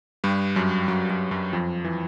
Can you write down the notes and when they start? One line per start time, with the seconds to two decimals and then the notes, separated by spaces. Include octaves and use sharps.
0.24 G2 G3
0.56 F#2 F#3
0.88 F#2 F#3
1.10 F#2 F#3
1.31 F#2 F#3
1.53 F2 F3
1.84 E3